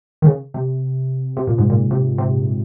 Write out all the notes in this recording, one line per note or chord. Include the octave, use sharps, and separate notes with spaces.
D#3
C#3
C3
C3
A#2
G#2
A#2
C3
C3